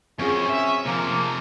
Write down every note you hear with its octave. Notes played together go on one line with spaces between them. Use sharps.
F#2 C4 C#4 F4 G#4
E5
C3 F3 A#3